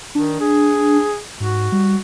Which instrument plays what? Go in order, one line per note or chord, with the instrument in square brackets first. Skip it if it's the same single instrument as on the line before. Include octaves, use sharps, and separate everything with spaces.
[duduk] D#3 [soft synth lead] D4
[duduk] G#4
[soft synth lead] G#2 [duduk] F#4
[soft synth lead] G3